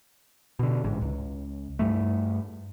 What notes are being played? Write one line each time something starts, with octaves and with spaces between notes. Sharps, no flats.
B2 D3
A1 G#2
C#2
G2 G3 A3